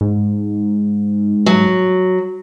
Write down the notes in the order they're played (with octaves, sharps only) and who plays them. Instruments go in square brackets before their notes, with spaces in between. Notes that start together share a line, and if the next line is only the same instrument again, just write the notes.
[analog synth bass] G#2
[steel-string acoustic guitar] F#3